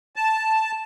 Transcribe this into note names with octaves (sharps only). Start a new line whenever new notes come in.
A5